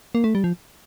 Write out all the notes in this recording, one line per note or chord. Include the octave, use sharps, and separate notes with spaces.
A#3
A3
G3
F3